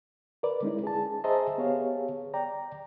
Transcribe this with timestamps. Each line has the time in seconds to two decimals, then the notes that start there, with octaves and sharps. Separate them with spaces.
0.43 A#4 B4 D5
0.63 G#3 C#4 D#4 E4
0.84 G#4 A5
1.24 G#4 C5 D#5 E5 A5 A#5
1.58 B3 G4 G#4 C#5 F5
2.34 D5 G5 A#5